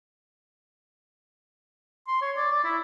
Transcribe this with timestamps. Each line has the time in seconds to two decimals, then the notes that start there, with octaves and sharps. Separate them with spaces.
2.08 C6
2.22 C#5
2.37 D5
2.51 D5
2.64 E4